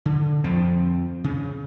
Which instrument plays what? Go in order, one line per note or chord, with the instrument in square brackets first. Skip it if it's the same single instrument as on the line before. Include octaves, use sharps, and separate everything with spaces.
[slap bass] D3
F2 F3 C4
C#3